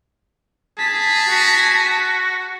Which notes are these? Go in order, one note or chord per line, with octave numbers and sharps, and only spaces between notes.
G#4 A5 B6
F#4